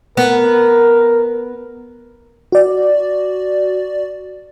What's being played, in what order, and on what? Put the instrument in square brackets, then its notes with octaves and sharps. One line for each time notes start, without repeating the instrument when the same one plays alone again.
[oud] B3 [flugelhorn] A#4
[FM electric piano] F#4 D5